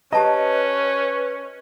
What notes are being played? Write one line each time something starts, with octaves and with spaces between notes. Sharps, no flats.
C#4 G4 B4 D#5 A5 A#5